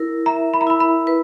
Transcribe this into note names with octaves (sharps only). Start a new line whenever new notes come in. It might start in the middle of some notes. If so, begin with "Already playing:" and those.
Already playing: E4 A#4
E5 A#5
B5
A#5
E4 B5
B5
B4